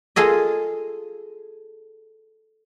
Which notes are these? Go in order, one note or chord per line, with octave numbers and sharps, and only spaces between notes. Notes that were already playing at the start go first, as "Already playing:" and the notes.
F4 G#4 A4 D#5